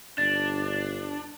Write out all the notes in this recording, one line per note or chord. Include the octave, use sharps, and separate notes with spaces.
G1 D4 A6